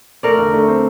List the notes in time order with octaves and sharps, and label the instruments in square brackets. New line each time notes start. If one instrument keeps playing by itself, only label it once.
[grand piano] A3 [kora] A#4 D5
[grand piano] D3
A3
C4